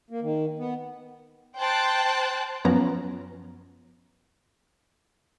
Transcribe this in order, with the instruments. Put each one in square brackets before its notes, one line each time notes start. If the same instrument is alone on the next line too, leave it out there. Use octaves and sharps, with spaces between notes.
[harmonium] A#3
D#3
B3
[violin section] C5 G5 A5 F#6
[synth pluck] F#2 F3 B3 C#4 A#5